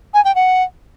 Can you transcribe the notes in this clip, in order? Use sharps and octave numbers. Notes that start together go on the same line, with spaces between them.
G#5
G5
F#5